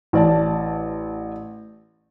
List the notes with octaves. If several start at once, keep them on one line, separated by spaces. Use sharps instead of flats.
A1 D5 A5